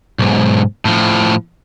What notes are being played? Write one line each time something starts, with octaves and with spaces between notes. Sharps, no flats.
B1 G#2
A2 F3